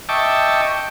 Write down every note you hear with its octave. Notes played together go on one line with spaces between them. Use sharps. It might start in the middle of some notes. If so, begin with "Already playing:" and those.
D#5 E5 G5 A5 C#6 D6